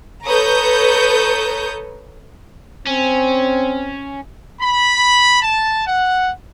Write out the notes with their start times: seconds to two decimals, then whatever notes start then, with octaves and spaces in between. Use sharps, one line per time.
0.24 A4 B4 C#5 A#5 D#6 G6
2.87 C4 C#4
4.61 B5
5.42 A5
5.87 F#5